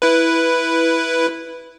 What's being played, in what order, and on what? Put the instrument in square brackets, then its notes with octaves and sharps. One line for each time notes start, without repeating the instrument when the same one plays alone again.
[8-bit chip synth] E4 B4